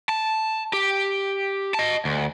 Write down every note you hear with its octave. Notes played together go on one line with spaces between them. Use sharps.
A5
G4
D#5 A5
D2